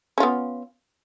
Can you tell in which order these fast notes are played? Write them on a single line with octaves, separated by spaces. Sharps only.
C#4 F4 B3